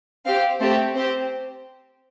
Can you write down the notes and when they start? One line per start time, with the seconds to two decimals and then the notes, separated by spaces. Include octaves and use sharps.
0.25 C4 G4 F5
0.60 A3 C4 G4 C5
0.95 C4 G4 C5